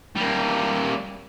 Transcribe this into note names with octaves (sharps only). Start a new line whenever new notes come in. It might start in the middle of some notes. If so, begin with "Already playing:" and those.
G3 A#3